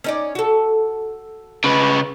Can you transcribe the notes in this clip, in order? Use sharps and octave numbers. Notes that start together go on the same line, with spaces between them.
C#4 D#4 D5
F#4 A4
C#3 B4